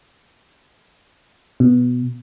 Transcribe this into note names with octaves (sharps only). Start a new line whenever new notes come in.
B2